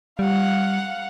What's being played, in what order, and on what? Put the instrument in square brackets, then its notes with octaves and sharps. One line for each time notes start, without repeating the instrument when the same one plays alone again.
[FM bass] G3 [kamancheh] F5 F#5